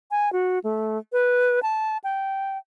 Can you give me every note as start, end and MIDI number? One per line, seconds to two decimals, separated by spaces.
0.11 0.32 80
0.32 0.59 66
0.64 0.98 57
1.13 1.62 71
1.63 1.98 81
2.04 2.58 79